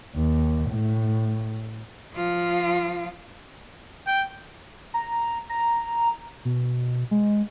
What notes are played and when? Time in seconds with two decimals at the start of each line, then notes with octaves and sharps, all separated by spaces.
0.16 D#2
0.70 A2
2.14 F3 F4
4.07 G5
4.94 A#5
5.49 A#5
6.45 B2
7.11 G#3